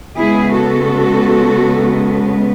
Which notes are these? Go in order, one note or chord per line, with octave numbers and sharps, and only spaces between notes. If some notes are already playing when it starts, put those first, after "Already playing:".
C#3 G#3 B3 E4 G#4
F#4 A4